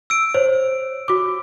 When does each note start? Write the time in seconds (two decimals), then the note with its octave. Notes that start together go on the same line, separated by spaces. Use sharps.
0.10 E6 D7
0.35 C5 C#5
1.08 F#4 D6